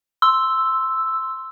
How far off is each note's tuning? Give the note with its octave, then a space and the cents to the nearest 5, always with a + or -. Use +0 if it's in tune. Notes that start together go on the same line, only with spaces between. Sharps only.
C6 +0 E6 +0